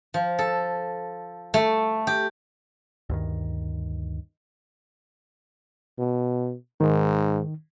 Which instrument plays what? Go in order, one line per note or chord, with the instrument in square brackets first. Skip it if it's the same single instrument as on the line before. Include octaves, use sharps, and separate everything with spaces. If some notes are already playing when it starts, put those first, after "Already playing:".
[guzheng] F3
A4
A3
G4
[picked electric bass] D2 G2 D#3
[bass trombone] B2
[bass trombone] G#2 [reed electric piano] D#3